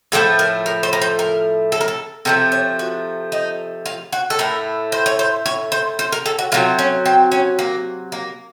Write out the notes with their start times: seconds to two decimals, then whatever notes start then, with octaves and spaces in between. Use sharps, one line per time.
0.12 A2 F3 A3 A4
0.39 A#4
0.66 A#4
0.83 C5
0.93 A#4
1.02 C5
1.19 A#4
1.72 A4
1.81 A#4
1.88 A4
2.25 C3 F3 A3 A4
2.52 C#5
2.79 F#4
3.32 D#4
3.86 F4
4.13 F#4
4.30 A4
4.39 A2 A3 A#4
4.92 C5
5.06 C#5
5.19 C5
5.46 C#5
5.72 C5
5.99 C5
6.12 A#4
6.26 A4
6.39 F#4
6.52 C3 F#3 A3 F4
6.79 C#4
7.06 C4
7.32 C#4
7.59 A#3
8.12 A#3